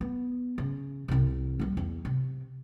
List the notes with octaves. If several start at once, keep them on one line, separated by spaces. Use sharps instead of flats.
B3
C#3
C2 C3
G3 A#3
E2
C3